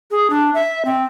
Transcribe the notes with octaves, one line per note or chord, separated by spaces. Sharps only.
G#4
D4
E5
C4